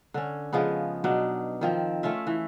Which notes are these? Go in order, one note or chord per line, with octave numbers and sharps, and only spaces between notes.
D3 C#4
C#3 F3 G#3 B3
B2 F#3 D4 D#4
D#3 F3 C4
A3 C#4 F4 E5
E3